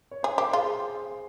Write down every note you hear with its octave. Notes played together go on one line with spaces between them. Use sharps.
C#5
G#4 C5
G4 C5
F4 G#4